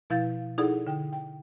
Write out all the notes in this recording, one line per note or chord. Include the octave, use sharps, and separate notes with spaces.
B2 F3 E4 F5 G6 A6
D#4 E4 G#4 A4 D5 F#5
D3 G5
G5